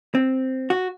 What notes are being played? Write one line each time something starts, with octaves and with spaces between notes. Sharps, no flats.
C4
F#4